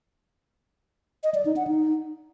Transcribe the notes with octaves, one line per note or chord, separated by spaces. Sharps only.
D#5
D5
D#4
F#5
D#4